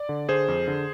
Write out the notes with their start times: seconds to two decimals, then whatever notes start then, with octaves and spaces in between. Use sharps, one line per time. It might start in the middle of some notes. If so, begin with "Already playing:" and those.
Already playing: D5
0.09 D3
0.29 D3 G#4 C5
0.48 F2
0.68 D3